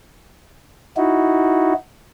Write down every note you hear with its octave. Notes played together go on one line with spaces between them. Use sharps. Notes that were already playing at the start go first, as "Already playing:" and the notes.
D#4 E4 F#4